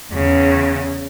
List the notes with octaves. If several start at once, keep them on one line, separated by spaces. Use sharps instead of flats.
E2 C#3